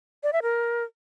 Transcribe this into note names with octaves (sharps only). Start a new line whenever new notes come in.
D5
E5
A#4